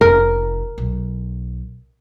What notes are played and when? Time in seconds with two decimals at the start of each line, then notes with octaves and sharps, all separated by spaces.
0.01 F1 A#4
0.78 B1